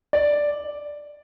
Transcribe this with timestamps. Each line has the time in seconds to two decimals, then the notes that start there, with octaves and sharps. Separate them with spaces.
0.13 D5